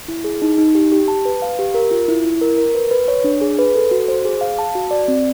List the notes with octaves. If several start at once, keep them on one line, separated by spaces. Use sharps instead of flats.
E4
G#4
D#4
D#4
G4
G4
A5
B4
F5
G4
A#4
F4
E4
E4
A#4
A#4
B4
B4
C#5
D4
G#4
B4
A4
F#4
C5
G#4
F5
A5
F#4
D5
C4